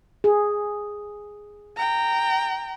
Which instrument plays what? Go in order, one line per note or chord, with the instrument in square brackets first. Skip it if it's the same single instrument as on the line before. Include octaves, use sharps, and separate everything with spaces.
[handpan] G#4
[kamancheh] G5 A#5